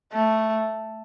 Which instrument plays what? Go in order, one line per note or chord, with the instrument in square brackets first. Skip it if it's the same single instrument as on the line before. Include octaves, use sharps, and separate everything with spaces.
[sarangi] A3